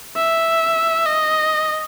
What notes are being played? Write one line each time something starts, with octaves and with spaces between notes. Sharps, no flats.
E5
D#5